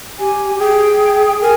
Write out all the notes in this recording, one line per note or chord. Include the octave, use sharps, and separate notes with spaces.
G4 G#5
G4
G#4 G5
A#4 G#5